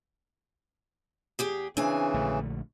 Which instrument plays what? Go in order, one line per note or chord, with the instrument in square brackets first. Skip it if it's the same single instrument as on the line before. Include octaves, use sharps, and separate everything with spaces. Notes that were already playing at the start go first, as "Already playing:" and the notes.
[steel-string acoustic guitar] E2 G4 G#4
[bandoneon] C#3 E3 [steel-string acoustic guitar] C4 G#5 [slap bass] D4
[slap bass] A#1 D3 A3